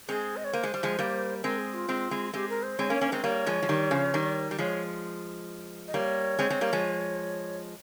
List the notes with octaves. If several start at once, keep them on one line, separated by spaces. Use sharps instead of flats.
G#3 C4 G#4
D#5
C#5
A#3 C5
G#3
G3
F3 G#3
G3 A#3
G#3 C4 A#4
G#4
F4
G#3 C4
G#3 C4
G#3 C4 G4
A#4
C5
G#3 C4 C#5
A#3 C#4
C#5
A#3 C#4
G#3 C4 A#4
G3 A#3 C#5
F3 G#3
F3
D#3 G3
C#3 F3
D#3 G3
G3
F3 G#3 C#5
D#5
G3 A#3 C#5
G#3 C4
G#3 C4
G3 A#3
F3 G#3